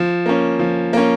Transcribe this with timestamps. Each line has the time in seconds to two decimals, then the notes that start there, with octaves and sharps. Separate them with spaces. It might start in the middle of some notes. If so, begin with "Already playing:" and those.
Already playing: F3
0.26 A#3 C#4
0.59 F3
0.93 A#3 C#4